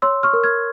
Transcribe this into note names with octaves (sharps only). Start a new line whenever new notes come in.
C#5 C6 E6
C#6 F6
A#4
F6 G#6